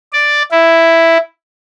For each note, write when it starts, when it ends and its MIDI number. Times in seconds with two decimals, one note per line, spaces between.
0.13 0.42 74
0.52 1.18 64